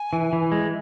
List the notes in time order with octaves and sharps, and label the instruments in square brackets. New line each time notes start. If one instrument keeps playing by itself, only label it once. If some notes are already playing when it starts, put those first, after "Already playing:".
Already playing: [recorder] G#5
[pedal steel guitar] E3
E3
G#3